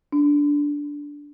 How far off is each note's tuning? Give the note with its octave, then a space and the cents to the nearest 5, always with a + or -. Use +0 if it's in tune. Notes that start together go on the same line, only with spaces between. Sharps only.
D4 -10